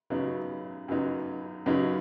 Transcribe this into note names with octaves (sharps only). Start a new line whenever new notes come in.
F#2 C#3 F#3 B3 D#4
F#2 C#3 F#3 B3 D#4
F#2 C#3 F#3 B3 D#4